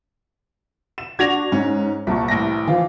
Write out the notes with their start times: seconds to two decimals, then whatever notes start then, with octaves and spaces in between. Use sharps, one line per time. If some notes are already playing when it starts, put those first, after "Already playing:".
0.98 E7
1.19 D4 F#4 F#5 G#6 A#6 F7
1.52 G#2 C#4
2.07 C2 A#2 A5 C#6
2.28 A1 E3 A#6
2.67 E3 F3 F4